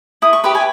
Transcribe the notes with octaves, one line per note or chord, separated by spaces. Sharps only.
E4 D#6
C#6
G4 B4 B5
G#5